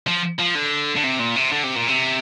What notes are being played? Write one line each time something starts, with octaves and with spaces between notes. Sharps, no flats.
F3
F3
D3
D3
C3
A#2
C3
D3
C3
A#2
C3